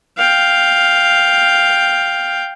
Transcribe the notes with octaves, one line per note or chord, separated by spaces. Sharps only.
F5 G5